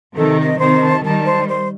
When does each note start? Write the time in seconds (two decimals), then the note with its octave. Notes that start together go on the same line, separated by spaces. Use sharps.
0.16 C3 D#3 A4
0.38 D#5
0.59 C3 D#3 C5
0.82 A5
1.04 D#3 G3 A5
1.26 C5
1.49 C5